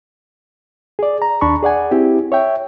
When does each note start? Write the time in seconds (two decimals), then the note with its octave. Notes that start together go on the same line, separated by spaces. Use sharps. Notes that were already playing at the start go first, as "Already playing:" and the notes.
0.99 G#4 D5
1.22 A#5
1.41 D#2 D4 A5 B5 C#6
1.63 G#4 D5 F#5 G#5
1.91 C4 E4 G4
2.32 C#5 E5 G5